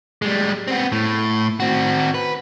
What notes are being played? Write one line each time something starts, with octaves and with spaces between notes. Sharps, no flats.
G3 G#3
B3 C4
A2
C4 F#4
B4